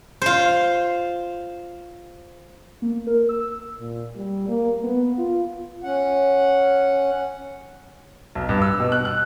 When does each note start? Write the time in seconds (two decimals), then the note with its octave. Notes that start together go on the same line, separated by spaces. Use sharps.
0.22 F4 C5
2.82 A#3
3.07 A#4
3.29 E6
3.79 A#2
4.16 G3
4.48 A#3
4.83 B3
5.18 F4
5.84 C#4 F#5
8.35 B1
8.49 G2
8.62 E6
8.80 B2
8.92 F#6
9.05 F#6